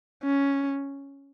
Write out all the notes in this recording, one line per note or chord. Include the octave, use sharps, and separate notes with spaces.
C#4